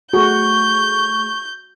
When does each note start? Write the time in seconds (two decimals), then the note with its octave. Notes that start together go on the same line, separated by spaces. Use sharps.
0.13 A3 F#4 G#4 C#6 G6